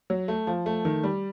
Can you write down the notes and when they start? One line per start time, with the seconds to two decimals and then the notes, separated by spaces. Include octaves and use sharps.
0.10 F#3
0.28 A3
0.47 F3
0.66 A3
0.85 D#3
1.03 G3